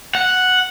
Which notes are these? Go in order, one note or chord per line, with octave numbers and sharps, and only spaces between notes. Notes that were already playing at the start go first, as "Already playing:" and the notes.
F#5